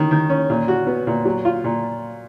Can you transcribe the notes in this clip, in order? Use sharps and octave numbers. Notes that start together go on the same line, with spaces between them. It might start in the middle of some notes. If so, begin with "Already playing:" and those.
Already playing: D#3 C#4
D#3
C#4
A#2
F#4
B3
A#2
F#3
F4
A#2